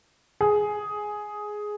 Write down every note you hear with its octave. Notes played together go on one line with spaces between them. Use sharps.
G#4